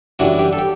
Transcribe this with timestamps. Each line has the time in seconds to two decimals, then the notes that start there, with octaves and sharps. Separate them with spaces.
0.19 F#2 E3 G3 D4 F#4
0.39 G4
0.53 A4
0.59 G4